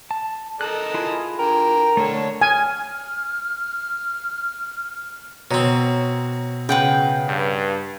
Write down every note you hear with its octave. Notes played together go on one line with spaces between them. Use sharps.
A5
A4 A#4 D#5 F#6
E4 F4 G#4
D3 A#4 G5
D3 A3 A4 C#5
G#5 F6
B2 C4 C#5 A#5
C#3 B4 F#5 G5 G6
G2